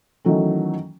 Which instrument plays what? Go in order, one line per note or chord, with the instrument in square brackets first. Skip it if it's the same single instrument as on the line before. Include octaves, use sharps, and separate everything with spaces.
[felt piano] D#3 E3 F#3 A3 C#4